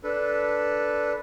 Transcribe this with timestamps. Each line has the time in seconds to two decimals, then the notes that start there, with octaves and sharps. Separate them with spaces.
0.04 D4 A4 B4